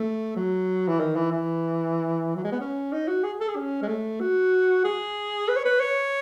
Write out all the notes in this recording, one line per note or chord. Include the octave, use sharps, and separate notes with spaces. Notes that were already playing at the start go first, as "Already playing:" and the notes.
Already playing: A3
F#3
E3
D#3
E3
E3
F#3
G#3
B3
C#4
D#4
F#4
G#4
A4
G#4
C#4
G#3
A3
F#4
G#4
B4
C#5
B4
C#5